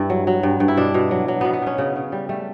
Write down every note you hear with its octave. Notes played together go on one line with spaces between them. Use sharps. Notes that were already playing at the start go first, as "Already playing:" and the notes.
Already playing: G2 E4
F#3
F#3
G2
G2
E4
B2 D4
B2
F#3
F#3
B2 B3
B3
B2 C#4
C#3
C#3
G3
G3 A3